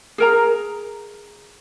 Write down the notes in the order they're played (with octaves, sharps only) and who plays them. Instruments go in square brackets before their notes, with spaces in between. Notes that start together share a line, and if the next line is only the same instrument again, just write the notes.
[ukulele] G#4 A#4 A#5